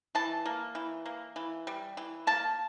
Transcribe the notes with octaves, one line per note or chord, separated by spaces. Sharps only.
E3 A5
A#3
E3
A#3
E3
G3
E3
A#3 A5